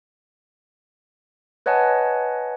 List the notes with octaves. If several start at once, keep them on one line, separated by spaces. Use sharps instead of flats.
B4 C#5 D#5 F#5 G#5 A5